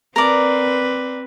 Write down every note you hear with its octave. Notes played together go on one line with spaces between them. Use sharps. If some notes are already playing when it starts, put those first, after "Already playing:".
C4 A#4 B4 D5